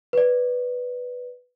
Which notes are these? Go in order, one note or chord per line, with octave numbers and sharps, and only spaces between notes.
B4 D5